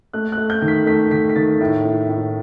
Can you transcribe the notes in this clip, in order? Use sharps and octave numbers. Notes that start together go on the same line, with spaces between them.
A3 F#6
F#6
A3
G6
D#3
B6
A3 B6
D#3 B6
B6
D#3 A6
A2
A2
A2